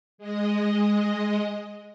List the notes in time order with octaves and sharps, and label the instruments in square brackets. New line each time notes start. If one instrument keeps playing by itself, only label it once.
[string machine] G#3 D#5